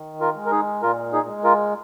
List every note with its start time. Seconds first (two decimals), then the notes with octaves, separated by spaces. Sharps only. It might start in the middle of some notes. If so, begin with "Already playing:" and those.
Already playing: D#3
0.21 F4 A#4
0.36 G#3
0.46 A#4
0.51 D#4 G#4
0.82 A#2 F4 A#4
1.13 D#4 G#4
1.28 G#3
1.44 F4 A#4